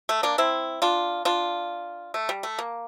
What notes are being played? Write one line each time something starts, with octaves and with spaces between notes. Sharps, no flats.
A3
A#3 D4
C4 E4
D4 F4
D4 F4
A3
G3
A3
A#3